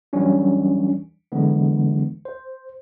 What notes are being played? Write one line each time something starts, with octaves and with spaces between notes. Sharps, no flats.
E3 F#3 G3 C#4 D4
D3 E3 F#3 G#3 B3 D4
C5